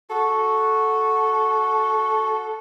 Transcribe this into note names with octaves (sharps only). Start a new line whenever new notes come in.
F#4 A4